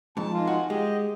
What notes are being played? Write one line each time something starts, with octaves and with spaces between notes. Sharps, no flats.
F2 G#2 A5
D#3 G#3 F4
F#4
G#3 G4 D#5